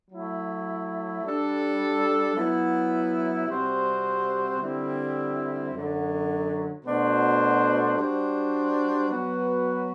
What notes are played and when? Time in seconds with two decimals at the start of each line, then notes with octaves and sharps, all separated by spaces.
0.11 F#3 A3 E4
1.24 G3 D4 A4
2.36 F#3 B3 E4
3.48 C3 G3 C4 F#4 C5
4.61 D3 G3 C4 E4
5.73 F#2 D3 F#3
6.85 B2 A3 D4 F#4 C5
7.97 G3 D4 F#4 C5
9.09 F#3 B3 F#4 B4